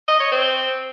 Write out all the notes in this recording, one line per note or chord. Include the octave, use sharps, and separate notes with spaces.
D#5
C#5
C4